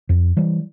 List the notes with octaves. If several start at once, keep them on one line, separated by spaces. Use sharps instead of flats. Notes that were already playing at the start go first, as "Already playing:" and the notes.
F2
E3 G3